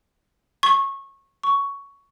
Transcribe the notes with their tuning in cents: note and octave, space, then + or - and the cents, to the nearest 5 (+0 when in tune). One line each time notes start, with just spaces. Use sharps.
C#6 -20
C#6 +10